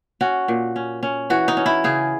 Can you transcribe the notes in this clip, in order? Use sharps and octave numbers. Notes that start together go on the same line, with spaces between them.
C#4 F#4
A#2
C#4
C#4
E3 F#4
D#4
C#4
E4
C#3 G#4